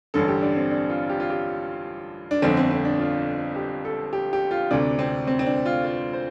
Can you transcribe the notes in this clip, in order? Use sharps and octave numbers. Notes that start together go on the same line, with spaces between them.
A1 G2 D3 A4
G4
D4
C4
D4
F4
G4
F4
G4
D4
G1 F2 D3 C4
C4
C4
D4
F4
G4
A4
G4
G4
F4
D2 C3 D4
C4
C4
C4
D4
F4
F4
C5